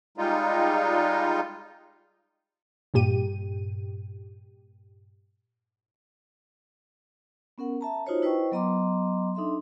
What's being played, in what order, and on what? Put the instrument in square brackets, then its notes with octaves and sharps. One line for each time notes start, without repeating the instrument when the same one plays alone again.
[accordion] G3 G#3 D#4 F4
[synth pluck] G2 A#2 G4 D#7
[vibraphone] B3 C#4 A#4 F#5
E5 A5 A#5
D#4 F4 F#4 C5 C#5 D#5
E4 B4 C5 D#5 G5 C#6
F#3 B3 D#5 A#5 C6 D6
D4 D#4 A4 E5 C6